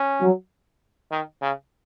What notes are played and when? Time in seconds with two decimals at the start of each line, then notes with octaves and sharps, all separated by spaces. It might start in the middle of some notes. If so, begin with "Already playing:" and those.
Already playing: C#4
0.21 F#3
1.12 D#3
1.42 C#3